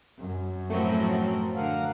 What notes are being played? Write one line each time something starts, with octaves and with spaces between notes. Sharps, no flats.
F#2
A2 F3 F#3 A3 C4 A4 A#4
D3 A#4 F5 F#5